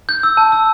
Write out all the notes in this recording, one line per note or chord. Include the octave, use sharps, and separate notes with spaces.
G6
E6
A5
E6